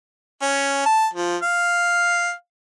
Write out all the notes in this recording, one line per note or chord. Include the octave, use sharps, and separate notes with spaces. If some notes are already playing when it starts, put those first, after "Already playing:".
C#4
A5
F3
F5